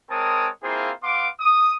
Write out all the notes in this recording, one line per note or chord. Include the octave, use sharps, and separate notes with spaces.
G#3 C4 A#4 C#5 A5 D#6
A#3 C4 E4 F4 G#4 C5
B3 F5 C6 D6
D#6